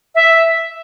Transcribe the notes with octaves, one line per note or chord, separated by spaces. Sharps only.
E5